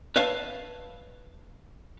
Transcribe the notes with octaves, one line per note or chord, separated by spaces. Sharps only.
B4 C#5 E5 F5 A5